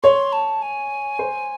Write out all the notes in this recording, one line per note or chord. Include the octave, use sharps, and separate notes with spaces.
C#5 C6
A5
G#5
C5